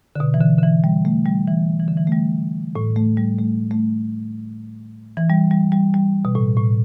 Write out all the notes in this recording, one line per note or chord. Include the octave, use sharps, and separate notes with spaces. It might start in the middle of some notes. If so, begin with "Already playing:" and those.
D3
B2
E3
D3
D3
E3
G3
A3
G3
E3
E3
D3
E3
A3
G3
A2
A3
G3
A3
A3
E3
G3
G3
G3
G3
B2
A2
A2